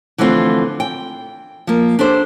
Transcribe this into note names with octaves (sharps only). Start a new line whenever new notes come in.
D3 E3 F3 A3 C4 F4
G5
F3 A#3
D4 G4 A4 C5